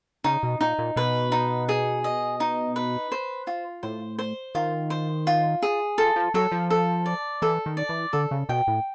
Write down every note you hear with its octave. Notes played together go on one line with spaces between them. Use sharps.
C#3 D#4
B2
A#2 D#4
A#2
B2 B4
D#4
G#4
D#5
D#4
B4
C5
F4
A2 C5
C5
D#3 F4
C5
F4
G#4
F3 A4
F3
F#3 A4
F3
A4
D5
E3 A4
D#3
D5
E3
D3 A4
C#3
B2 G5
A2